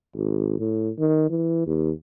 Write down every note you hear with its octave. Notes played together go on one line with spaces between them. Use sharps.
G#1
A2
D#3
E3
D#2